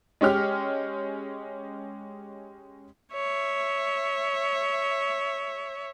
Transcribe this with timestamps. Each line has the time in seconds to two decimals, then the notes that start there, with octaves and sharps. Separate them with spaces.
0.21 G#3 C#4 G4 F6
3.13 C#5 E5